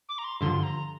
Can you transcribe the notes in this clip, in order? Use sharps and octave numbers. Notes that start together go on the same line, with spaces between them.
D6
A#5
C6
G2 D3 F3 C6
A#5